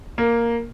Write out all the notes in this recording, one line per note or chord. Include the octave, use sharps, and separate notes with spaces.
A#3